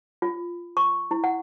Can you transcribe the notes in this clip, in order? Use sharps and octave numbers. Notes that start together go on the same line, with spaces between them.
F4
C#6
E4
F#5